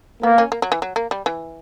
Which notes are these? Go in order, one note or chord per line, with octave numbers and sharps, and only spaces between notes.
A#3 B3
C#4
A#3
F#3
E3
F#3
A#3
G3
E3